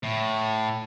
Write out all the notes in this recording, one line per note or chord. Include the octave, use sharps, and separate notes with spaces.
A2